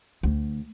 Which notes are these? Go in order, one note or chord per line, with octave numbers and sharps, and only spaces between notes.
D2